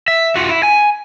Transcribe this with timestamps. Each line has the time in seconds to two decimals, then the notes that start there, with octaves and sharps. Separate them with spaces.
0.08 E5
0.35 F4 F#4
0.49 E4
0.63 G#5